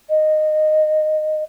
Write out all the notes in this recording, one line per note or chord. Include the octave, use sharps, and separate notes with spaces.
D#5